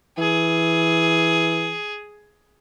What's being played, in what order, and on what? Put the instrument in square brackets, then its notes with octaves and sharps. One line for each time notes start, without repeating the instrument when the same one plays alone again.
[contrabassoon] E3 [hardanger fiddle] G#4